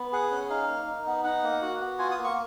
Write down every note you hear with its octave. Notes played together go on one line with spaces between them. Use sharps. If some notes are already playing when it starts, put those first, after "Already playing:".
Already playing: B3
G#4 F#5
C#4
D#4 F5
A#3
D#4
B3
D#4 F#5
A#3
F#4
B3
F4 G#5
D#6
A#3
C#6